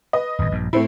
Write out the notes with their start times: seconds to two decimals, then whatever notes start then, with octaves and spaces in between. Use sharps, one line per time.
0.13 B4 D#5
0.39 D#1 G#1 F2
0.52 A#1 G2
0.73 A2 A3 C4 E4